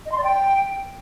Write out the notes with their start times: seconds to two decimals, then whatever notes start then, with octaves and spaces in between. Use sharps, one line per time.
0.06 D#5
0.12 C6
0.18 D5
0.24 G5